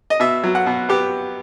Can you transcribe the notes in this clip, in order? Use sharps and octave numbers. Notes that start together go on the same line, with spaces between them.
D#5
B2 E5
F#3
F#5
B2
B3 G4